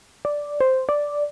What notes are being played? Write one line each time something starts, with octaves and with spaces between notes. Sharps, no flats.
D5
C5
D5